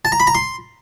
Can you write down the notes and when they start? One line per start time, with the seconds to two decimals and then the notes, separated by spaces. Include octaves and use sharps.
0.05 A5
0.12 A#5
0.20 B5
0.27 A#5
0.35 C6